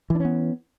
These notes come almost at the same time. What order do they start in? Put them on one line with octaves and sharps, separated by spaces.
E3 D4 C#4 B3